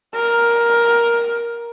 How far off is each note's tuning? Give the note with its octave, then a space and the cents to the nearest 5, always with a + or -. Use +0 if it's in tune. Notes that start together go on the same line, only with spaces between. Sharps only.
A#4 +10